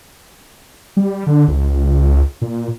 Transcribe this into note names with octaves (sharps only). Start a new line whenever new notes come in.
G3
D3
C#2
A#2